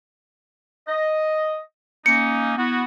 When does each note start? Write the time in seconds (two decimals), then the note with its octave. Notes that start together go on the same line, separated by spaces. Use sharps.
0.88 D#5
2.06 A#3 C#4 D#4 C#7
2.57 B3 E4 F#4